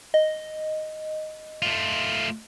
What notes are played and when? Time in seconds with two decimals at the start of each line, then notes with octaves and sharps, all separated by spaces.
0.14 D#5
1.62 A3 F4